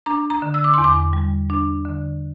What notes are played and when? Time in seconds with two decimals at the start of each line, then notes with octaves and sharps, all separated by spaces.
0.06 D4 A#5
0.30 A#5
0.42 D3
0.54 E6
0.64 D6
0.74 E2 C6
0.84 D6
1.13 G3
1.50 D4
1.85 D3